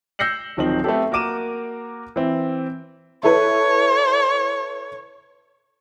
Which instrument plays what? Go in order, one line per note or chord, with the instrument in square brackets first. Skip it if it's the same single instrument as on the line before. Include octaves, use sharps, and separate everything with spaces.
[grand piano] E6 G6 A#6 C7 C#7 F#7
D1 D#3 F3 C4 D#4 F#7
A3 B3 C4 G4 A4
A#3 F#4 A#4 D6 D#7 E7
E3 C4
[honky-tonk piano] E4 A4 B4 [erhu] C#5